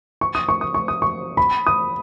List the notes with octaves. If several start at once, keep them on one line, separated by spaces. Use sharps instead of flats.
C#6
D#6
C#6
D#6
C#6
D#6
C#6
B5
D#6